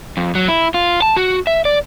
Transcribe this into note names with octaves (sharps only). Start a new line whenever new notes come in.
F2
F#3
E4
F4
A5
F#4
E5
D5